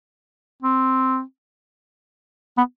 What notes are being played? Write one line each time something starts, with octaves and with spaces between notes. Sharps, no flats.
C4
B3